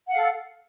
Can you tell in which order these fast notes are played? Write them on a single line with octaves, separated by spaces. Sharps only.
F#5 F5 A4